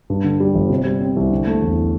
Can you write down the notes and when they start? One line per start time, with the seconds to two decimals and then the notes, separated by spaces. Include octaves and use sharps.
0.10 G2
0.24 D3
0.40 G3
0.55 G1
0.70 C3
0.85 G3
1.01 C4
1.16 C2
1.31 D3
1.47 A3
1.62 E2